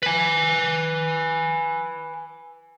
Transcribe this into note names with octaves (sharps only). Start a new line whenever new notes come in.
B4 G#5